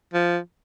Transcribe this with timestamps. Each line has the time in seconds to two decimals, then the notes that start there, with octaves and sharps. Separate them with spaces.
0.14 F3